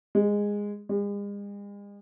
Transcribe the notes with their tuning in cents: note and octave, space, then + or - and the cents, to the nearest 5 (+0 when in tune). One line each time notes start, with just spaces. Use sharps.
G#3 -15
G#3 -45